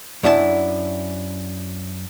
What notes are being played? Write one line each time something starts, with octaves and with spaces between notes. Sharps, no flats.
F#2 D4 E4 F4 A5